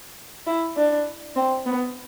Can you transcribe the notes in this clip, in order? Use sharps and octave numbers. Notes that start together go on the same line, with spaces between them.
E4
D4
C4
B3